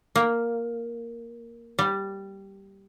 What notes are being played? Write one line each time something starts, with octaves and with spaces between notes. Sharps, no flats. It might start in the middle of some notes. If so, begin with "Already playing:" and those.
A#3
G3